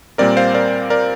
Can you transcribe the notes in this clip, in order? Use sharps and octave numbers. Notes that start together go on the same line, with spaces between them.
A#2 G3 C4 A#4 D5
C5 F5
A#4 D5
A#4 D5